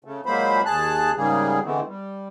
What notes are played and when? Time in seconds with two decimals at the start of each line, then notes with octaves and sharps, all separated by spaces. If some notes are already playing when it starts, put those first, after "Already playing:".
0.04 C#3 A3
0.26 A#2 F#3 G#3 A#3 C5 B5
0.65 D#2 G#4 A5 F#6
1.16 G#2 C#3 G3 A#3 G#4
1.64 D3 E3 G#3 A3 B3 C4
1.86 G3